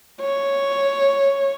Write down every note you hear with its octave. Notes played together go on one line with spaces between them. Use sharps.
C#5